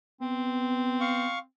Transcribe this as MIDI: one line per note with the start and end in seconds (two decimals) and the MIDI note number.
0.21 1.26 59
0.21 1.44 60
1.01 1.39 77
1.01 1.39 85